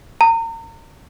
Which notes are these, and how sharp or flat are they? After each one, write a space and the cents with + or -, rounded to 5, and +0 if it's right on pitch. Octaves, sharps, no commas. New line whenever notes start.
A#5 -35